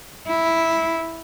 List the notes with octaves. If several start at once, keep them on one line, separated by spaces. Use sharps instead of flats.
E4